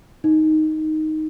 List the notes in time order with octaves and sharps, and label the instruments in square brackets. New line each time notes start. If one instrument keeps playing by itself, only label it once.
[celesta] D#4